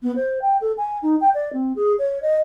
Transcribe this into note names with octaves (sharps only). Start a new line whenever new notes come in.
B3
C5
G5
A4
G#5
D#4
G5
D5
C4
G#4
C#5
D#5